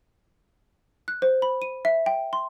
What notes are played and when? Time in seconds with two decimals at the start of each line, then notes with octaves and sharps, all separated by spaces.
1.08 F#6
1.22 C5
1.42 B5
1.62 D#7
1.85 E5
2.06 G5
2.33 C6